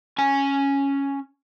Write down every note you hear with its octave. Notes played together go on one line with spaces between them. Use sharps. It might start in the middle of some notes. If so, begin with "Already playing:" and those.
C#4 G#5